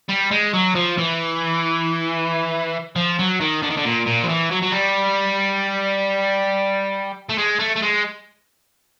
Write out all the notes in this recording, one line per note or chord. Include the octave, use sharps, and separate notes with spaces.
G3
G#3
F#3
F3
E3
F3
F#3
D#3
D3
D#3
D3
A#2
A#2
F3
E3
F#3
F#3
G3
A3
G#3
A3
A3
G#3